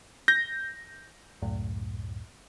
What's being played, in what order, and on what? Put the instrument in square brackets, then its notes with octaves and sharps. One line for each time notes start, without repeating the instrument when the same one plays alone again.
[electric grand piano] G6 A#6
[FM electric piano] C#2 F#2 A2